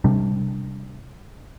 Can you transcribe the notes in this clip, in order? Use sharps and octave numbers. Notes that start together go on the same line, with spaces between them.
C3 G3 D4